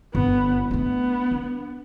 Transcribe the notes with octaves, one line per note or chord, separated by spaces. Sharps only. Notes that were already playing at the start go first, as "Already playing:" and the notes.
G1 B3
A3 B3 D4
D4